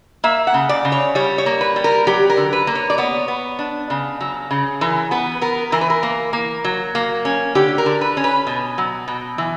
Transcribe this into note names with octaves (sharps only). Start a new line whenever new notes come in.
A#3 E5
F#5
C#3
D5
C#3
C#5
G3 C#5
C#5
A#3
B4
G3
A#4
F#3 G4
A#4
D3
B4
A#3
C#5
D5
B3 C#5
B3
D4
C#3
F#3
C#3
E3 A#4
B3 B4
B3 A#4
E3 A#4
B4
A#4
A#3
A#3
F#3
A#3
C#4
D3 G4
A#4
D3
B4
C#4
B4
B2
F#3
B2
E3